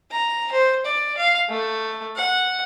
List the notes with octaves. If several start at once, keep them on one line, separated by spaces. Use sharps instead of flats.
A#5
C5
D5
F5
A3
F#5